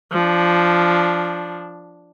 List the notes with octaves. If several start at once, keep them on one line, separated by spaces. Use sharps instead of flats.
F3 D4